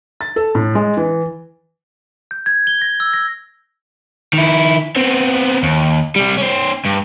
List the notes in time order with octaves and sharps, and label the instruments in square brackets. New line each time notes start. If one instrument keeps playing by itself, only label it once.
[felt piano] A6
A4
A2
G#3
E3
[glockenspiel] G6
G#6
G7
A#6
E6
A#6
[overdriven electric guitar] D#3 E4
B3 C4
D#2
C3 G3
C#4 C5
G2